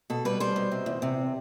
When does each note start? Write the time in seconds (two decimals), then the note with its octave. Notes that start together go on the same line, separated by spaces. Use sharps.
0.10 B2 A4
0.25 G3 B4
0.40 G3 C5
0.56 B2
0.72 C3
0.86 E2
1.02 C3